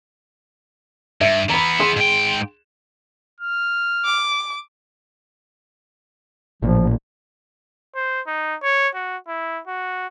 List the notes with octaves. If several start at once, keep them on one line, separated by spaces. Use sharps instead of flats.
G2 E5
E3 B3 A#5 B5
G#4 C6 E7
G#2 G5
F6
D6
A1 A#2 F3
C5
D#4
C#5
F#4
E4
F#4